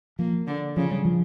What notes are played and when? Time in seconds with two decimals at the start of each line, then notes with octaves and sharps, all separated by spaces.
0.19 F3 A#3
0.47 D3
0.76 C#3 F3
0.91 G3
1.05 F3